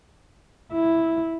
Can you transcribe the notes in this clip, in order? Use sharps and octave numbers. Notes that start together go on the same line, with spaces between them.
E4